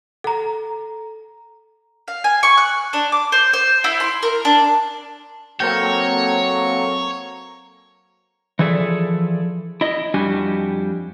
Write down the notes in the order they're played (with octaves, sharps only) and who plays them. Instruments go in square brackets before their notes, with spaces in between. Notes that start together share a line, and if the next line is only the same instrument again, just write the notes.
[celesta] A4 A#5
[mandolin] F5
G#5
C#6
F#6
D4
D6
C5
C5
E4
C6
A#4
D4
[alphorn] F#3 [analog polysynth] A#3 C4 A4 [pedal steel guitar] A#4 G5 [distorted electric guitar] C#5
[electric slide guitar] E3 F3 G#4 A4 D5 E5
E4 D#5
F2 G3 D4 F#4 G4 G#5